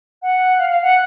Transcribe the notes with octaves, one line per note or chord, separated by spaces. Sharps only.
F#5
F5
F5
F#5